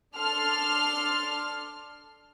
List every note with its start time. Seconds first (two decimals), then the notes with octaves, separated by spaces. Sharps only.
0.17 D4 A4 C6 F6